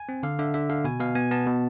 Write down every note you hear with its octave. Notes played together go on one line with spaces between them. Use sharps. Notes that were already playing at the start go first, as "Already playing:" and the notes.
Already playing: G#5
C4
D3 F5
D3 E5
D3 E5
D3 F5
B2 G#5
B2 F5
B3 G#5
B3 A5
B2